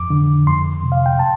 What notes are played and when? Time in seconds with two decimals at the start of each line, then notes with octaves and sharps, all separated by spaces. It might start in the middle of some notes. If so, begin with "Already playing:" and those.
Already playing: F2 D6
0.10 D3
0.47 F2 C6
0.83 C3
0.92 F5
1.06 G5
1.19 A5